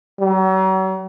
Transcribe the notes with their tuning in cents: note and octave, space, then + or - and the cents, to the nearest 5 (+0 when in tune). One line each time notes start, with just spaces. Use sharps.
F#3 +40